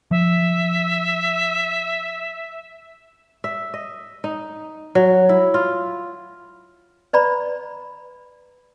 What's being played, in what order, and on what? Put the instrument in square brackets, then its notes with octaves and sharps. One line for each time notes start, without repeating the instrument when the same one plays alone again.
[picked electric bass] F3 [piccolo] E5
[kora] E5
D#5
D#4
F#3
E4
F4
[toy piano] B4 D5 A#5 B5